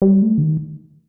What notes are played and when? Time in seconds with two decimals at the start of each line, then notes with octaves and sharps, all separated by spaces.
0.02 G3
0.22 A3
0.38 D3
0.42 D#3